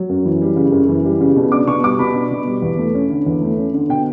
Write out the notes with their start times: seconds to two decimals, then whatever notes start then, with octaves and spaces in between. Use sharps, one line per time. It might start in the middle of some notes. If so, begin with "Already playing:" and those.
Already playing: F#3
0.09 F#2
0.26 E3
0.41 G3
0.56 C#3
0.72 F#2
0.89 E3
1.05 G3
1.21 C#3
1.36 B2
1.52 D4 D6
1.68 B2 C#6
1.83 G3 D6
1.99 B2 B5
2.15 D4
2.31 B2
2.47 G3
2.62 E2
2.79 A3
2.94 C#4
3.10 D3
3.26 E2
3.41 A3
3.58 C#4
3.74 D3
3.89 B2 G5